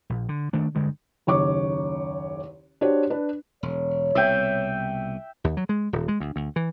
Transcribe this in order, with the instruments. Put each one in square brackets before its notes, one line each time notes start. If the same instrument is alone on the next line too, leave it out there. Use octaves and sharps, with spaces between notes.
[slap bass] A#1
D3
D#3 A3 D4
G2 D3 G#3
[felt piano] F#1 D#2 C#5 C#6 D6
D4 F#4 G4 C5 C#5
D4 B4
[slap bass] E1 [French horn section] C#5
[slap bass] C2 B2 [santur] E5 G5
[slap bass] D#2
F#3
G#3
D#1
G#3
D2
D2
E3